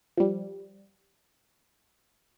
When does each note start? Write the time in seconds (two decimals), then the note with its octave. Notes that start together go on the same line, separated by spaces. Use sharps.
0.17 F3 G3